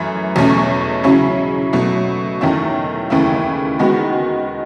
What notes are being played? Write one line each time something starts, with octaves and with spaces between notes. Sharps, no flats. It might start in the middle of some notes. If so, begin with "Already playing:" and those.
Already playing: F#2 E3 A3
E2 B2 A3 C#4
C#3 F#3 C#4 E4
B2 F#3 A3
E2 D#3 A3 C#4 E4
D#2 C#3 E3 A3 E4
D#3 G#3 B3 F#4